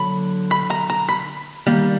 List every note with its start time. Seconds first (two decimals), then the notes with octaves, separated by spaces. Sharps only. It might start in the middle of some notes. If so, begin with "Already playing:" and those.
Already playing: D3 F#3 A#3 B5
0.51 B5
0.70 A#5
0.90 A#5
1.09 B5
1.67 D#3 G3 A#3